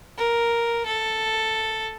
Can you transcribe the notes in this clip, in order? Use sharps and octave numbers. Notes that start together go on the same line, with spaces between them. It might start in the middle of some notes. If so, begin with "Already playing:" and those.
A#4
A4